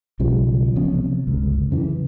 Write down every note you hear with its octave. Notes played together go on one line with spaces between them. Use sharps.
B1 C#3 F3 G3
F3 B3 C#4
C3
G1 C#2
F#2 C#3 E3